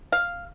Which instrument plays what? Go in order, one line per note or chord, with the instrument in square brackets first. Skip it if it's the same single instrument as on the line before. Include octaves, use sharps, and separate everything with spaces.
[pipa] F5